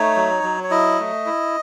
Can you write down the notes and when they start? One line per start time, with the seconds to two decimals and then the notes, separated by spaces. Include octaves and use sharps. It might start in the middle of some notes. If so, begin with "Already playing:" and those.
Already playing: A3 D#4 C#5
0.16 F#3
0.44 F#3
0.64 C#5
0.71 E4 D#5
0.99 A3
1.26 E4